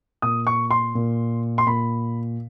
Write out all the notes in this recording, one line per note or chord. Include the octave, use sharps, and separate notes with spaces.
A#2 D#6
C#6
C6
A#2
C6
A#2 B5